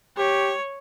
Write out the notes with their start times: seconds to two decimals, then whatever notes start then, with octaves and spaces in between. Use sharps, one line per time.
0.17 G4 C#5